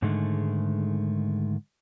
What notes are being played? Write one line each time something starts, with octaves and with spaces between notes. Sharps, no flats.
G#2 D3 D#3 G#3 A3